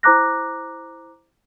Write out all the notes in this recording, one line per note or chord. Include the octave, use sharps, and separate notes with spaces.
E4 C5 A#5 D6 F#6 A#6